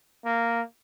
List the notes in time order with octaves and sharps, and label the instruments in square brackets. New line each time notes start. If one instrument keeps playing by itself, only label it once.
[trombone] A#3